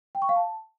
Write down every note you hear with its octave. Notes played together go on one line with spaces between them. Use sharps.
G5
C#6
F5
A5